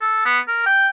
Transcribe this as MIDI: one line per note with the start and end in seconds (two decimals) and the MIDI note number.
0.02 0.24 69
0.25 0.39 59
0.48 0.61 70
0.66 0.87 79